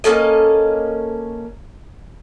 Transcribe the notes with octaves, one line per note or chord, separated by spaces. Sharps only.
A#3 C#4 A4 D#5